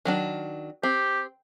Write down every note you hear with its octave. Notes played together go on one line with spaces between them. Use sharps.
D#3 F#3 D4
C4 G4